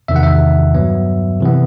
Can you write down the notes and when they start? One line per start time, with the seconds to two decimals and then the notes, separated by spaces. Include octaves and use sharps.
0.08 E2 C3 D#3 E5
0.16 F#5
0.23 E5
0.74 G2 F#3 B3
1.40 C3 E3 B3